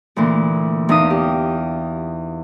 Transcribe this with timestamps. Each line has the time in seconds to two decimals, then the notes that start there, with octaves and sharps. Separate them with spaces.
0.16 D2 A#2 E3
0.89 E2 D#4 E5 F5 D#6
1.10 G4